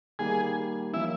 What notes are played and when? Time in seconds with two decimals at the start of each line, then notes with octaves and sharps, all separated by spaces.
0.19 D#3 G3 A#3 G#4
0.93 F3 A#3 C#4 E4